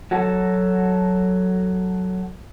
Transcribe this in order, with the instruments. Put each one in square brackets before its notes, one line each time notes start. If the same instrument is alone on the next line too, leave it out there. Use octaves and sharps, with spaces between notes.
[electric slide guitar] F#3 F#4 A4